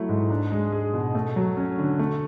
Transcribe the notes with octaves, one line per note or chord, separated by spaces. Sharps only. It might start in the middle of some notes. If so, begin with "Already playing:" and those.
Already playing: F#3 A3 E4
G#2
D4
G#3
G#4
B2
A3
F#3
C#4
D3
A3